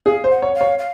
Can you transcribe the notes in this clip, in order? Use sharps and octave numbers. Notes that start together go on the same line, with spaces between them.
G#4 F5
C5
F#5
C#5
F5
C#5
F5